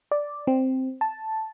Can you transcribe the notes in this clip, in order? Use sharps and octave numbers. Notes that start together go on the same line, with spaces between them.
D5
C4
A5